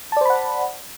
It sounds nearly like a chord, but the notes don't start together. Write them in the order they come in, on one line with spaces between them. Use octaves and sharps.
A5 D5 C5 B5 F#5